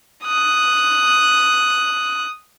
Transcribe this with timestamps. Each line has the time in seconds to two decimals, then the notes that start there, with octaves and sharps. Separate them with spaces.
0.24 D#6 F#6